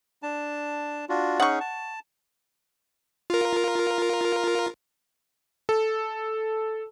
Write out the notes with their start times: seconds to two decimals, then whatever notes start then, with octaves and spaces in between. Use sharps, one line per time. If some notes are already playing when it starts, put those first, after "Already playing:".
0.23 D4 A5
1.09 D4 F4 F#4
1.40 C#4 D#4 G#4 F#5 C#6
1.60 A5
3.30 F4 A#4
5.69 A4